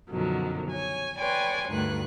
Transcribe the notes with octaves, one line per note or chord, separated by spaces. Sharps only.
F#2 B2 D3 D#3 F3 F#3
C#5 G#5
B4 C#5 D5 G5 G#5 C6
D2 G2 D#3 B4 F#6